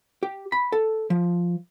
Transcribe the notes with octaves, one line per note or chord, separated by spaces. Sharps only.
G4
B5
A4
F3